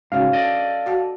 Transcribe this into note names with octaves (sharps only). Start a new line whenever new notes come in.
G#2 C#3 C#4 F#4 C#5 F5
A4 D5 D#5
F#4 F#5 A5